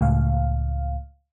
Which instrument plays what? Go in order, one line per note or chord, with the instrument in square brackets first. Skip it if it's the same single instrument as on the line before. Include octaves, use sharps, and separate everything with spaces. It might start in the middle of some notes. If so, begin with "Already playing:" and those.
[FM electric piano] C#2 A2 F5